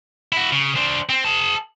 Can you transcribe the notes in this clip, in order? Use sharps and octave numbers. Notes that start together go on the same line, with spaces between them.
E4 F#4
C#3
D4 C5
C4
G#4 A5